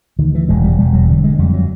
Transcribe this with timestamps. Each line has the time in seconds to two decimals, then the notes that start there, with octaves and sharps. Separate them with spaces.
0.19 D2 D#3
0.35 E3
0.49 E1 G#3
0.64 G3
0.79 E1 G3
0.93 F#3
1.09 D3 G3
1.24 G#3
1.39 F2 G3
1.54 F#3